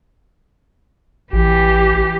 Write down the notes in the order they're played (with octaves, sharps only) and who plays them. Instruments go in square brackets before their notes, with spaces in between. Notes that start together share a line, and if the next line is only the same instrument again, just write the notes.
[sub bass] A1 [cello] E3 G4